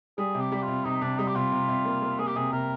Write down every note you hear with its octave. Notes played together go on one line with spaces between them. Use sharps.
G3 G#4
C3
G4
G3 G4
F4
C3
C3 D#4
C3 D4
G3 D#4
G4
C3 F4
C3
C3
A#3
A#3
A#3 G#4
G4
C3 G#4
C3 A#4